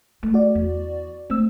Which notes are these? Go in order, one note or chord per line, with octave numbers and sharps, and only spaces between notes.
A3
F#4 D5
E2
A3 C4 E6